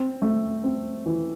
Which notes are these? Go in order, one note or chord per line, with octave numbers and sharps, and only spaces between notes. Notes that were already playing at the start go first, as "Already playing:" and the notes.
Already playing: C4
A3
C4
E3